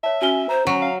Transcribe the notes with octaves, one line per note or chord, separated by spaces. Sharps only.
C#5 E5 A5
C#4 F#4 G#5 G7
C5 A#5
F#3 C#4
F5